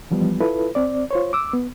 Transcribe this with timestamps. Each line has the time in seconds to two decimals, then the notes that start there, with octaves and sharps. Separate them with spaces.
0.11 E3 F3 G3 B3
0.41 E4 F4 A4 B4
0.75 C4 D5
1.11 F4 C5 C#5
1.33 D6 E6
1.53 B3